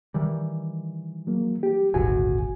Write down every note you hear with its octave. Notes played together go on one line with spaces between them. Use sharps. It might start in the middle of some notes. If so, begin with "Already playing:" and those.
D#3 E3 G3
F#3 A#3
G4
D#1 G#1 D3 F#4 G#5